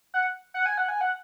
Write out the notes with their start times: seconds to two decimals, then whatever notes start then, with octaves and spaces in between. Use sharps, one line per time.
0.14 F#5
0.54 F#5
0.66 G#5
0.78 F#5
0.88 G#5
1.01 F#5